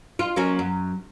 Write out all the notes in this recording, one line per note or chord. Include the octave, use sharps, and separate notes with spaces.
F4
F#3 A#3 C#4
F#2